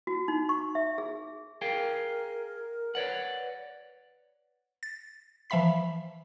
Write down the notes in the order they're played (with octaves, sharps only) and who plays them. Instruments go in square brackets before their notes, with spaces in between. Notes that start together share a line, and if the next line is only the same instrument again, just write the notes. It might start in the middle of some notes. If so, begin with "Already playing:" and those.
[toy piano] F#4
D#4
C#6
E5
G#4
[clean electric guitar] G#4 F5 G5 [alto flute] A#4
[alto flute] B4 [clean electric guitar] C#5 D5 F#5
[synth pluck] A6
E3 F3 E5 F5 B5 B6